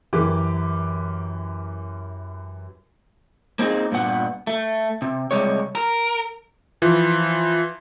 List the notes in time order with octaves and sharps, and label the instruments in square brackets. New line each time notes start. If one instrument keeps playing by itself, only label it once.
[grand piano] F#2 E3 G4 A#4 D6
[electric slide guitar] A#3 C4 D#4 G#4
G2 A#2 B3 F#5
A3
C3
C3 G3 G#3 C#5
[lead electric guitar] A#4
[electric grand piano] E3 F3